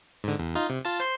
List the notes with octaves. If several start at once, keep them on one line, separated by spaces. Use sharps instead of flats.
G#2 D3
E2
D#4 F4
C3
F4 A5
C5 C6